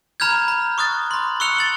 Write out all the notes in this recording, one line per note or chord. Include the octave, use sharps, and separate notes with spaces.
A#5 B5 F6 G6 G#6
B5
C#6 D#6 F#6 A6
B5 C6
C#6 E6 F#6 C#7 F7 G7
A6 F#7